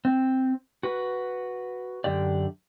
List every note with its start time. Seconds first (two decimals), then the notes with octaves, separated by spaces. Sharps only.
0.05 C4
0.83 F#4 B4
2.04 F#2 D3 G4 D5